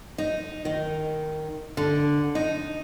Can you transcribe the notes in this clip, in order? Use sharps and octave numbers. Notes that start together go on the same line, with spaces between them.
D#4
D#3
D3
D#4